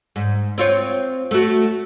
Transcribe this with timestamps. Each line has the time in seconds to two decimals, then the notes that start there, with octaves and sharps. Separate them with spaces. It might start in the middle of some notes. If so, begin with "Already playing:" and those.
0.16 G#2
0.58 C4 F4 C#5
1.31 A3 F#4